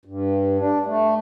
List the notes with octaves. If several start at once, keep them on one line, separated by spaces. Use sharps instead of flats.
G2
D4
A3